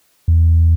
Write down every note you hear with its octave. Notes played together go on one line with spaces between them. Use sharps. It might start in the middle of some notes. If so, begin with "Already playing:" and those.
E2